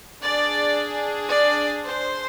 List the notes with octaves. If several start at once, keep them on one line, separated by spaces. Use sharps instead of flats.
D4 G#4 D5
D5
C5